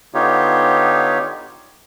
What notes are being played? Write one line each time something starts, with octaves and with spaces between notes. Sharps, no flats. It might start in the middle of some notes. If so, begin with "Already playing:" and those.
D3 B3 D#4 F4 G4 C#5